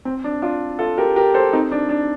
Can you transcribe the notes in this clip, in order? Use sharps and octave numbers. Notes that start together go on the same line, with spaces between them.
C4
D4
D4 F4
F4 A4
G4 A#4
G4 A#4
A4 C5
C4 D#4
D4
D4